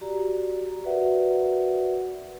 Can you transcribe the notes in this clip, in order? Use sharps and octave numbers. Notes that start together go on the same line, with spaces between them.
F#4 G4 D5 A#5
F#4 A#4 B4 D5 E5 F#5